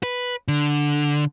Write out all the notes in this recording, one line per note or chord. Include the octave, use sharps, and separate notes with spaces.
B4
D3